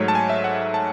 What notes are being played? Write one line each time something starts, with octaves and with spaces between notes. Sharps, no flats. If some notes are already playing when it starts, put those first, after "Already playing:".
Already playing: G#2 F#3 A3 C#5
A5
G#5
E5
F#5
A5